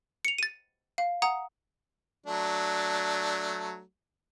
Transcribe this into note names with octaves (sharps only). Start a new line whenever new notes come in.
C#7 F7
A6 D#7
F5
F#5 A#5 D#6
F#3 A3 D4